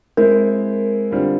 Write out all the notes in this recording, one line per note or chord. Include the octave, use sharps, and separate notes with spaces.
G#3 C4 E4 A#4
D3 G3 C4 F4